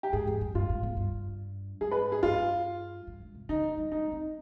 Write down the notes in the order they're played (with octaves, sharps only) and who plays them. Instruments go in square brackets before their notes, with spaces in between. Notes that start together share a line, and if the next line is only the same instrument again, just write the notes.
[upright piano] G4
[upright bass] G#2 [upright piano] G#4
[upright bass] F2
G2
[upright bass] G2 [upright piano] F4
[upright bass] G#2
B2
G2
[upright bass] G#2 [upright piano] G#4
[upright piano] B4
G#4
[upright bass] G2 [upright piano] F4
[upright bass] G2
G#2
C3
[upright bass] D3 [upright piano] D#4
[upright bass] D#3
G3
[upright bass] G#3 [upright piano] D#4
[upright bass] C4